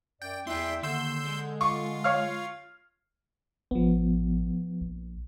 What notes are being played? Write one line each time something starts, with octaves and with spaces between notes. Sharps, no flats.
F#2 D5 G5
E2 E4 D5 E5 G5 C6
D#2 D3 C6 E6 G6
G#3
F4 C#6
C#5 F5 F6
A1 F3 B3
A#1